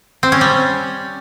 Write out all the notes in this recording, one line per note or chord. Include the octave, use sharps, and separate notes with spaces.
C4
C#4
G3